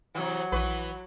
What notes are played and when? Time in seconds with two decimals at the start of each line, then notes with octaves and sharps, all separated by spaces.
0.15 C3 E3 F#3
0.52 A#1 E3 B4 C#6